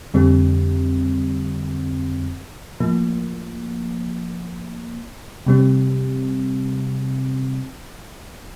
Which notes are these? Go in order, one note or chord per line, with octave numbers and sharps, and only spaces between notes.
F2 D3 G3 C4
A2 F3 A#3
C3 G3 C4